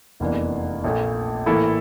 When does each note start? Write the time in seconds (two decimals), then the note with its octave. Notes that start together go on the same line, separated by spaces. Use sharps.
0.20 F1 E2 E3 A#3 D4
0.84 A#1 A#2 A3
1.46 A2 E3 A#3 E4 A4